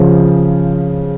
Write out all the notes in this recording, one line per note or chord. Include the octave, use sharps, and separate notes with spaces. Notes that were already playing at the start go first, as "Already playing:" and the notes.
Already playing: C#3 F3